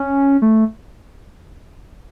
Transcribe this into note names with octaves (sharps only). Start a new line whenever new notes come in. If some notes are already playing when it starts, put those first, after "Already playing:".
Already playing: C#4
A3